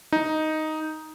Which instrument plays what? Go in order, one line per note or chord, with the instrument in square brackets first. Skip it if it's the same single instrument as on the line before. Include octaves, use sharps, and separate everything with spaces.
[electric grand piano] D#4